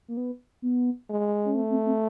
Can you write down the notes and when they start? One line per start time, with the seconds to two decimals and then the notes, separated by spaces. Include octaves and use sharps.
0.08 A#3
0.17 B3
0.62 B3
1.10 G#3
1.45 C#4
1.55 A3 C4
1.70 C4
1.86 C4